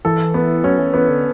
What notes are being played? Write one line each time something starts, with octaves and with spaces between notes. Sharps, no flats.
E3 A4
B3
F#3 C#4
E3
E3 B3
D3